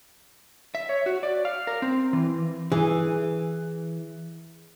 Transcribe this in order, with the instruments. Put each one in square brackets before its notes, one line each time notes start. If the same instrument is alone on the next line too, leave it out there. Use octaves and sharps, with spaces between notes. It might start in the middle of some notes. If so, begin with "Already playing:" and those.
[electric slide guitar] E5
C#5
F#4
D5
F5
A#4
C4
E3
[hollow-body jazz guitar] E3 [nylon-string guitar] G#4